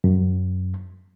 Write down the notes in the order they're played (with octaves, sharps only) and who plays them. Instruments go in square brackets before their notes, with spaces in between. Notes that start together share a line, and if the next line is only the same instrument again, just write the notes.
[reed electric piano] F#2